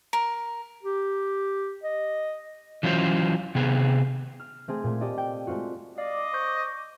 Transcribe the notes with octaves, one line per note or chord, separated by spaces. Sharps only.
A#4
G4
D#5
E3 F#3 C#4 F4 G#4 C5
C3 B3 G#4
F6
A3 C4 G#4
A#2 A3 G#5
G4 A4 D5 D#5
G5
G#3 A3 C4 F4 F#4
D5 D#5 F5 D6
C5 C#6 G6 A#6